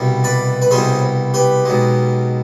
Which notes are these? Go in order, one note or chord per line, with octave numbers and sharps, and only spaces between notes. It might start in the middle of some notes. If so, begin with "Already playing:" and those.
Already playing: C2 B2 G3
B4 D5
B4
C2 B2 G3 G#4 C5
G4 B4
B1 B2 G#3